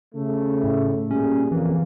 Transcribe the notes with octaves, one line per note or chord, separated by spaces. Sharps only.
C#3 A3
A2
A#2 G3 C#4 G#4
F2 C#3 E3 A#3